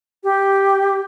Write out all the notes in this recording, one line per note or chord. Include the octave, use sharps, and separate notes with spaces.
G4